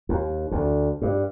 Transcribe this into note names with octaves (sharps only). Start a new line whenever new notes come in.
D#2
D2
G2